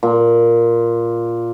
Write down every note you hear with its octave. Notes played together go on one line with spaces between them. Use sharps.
A#2